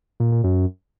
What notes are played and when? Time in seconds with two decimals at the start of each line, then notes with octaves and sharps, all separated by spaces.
0.20 A#2
0.32 A#2
0.44 F#2